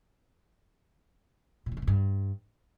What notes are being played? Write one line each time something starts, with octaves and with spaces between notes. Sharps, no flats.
A#2
C#3
D#3
C3
G2